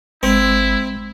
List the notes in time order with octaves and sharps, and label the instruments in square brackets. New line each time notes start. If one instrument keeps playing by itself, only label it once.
[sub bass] G#1 [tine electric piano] G#3 [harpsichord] C4 [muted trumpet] E4